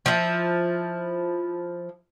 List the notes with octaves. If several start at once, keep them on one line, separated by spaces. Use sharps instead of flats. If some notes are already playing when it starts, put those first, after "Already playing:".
F3 E4